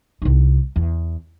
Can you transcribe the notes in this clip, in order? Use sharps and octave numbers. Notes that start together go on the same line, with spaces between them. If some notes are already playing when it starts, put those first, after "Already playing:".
C2 D#4
E2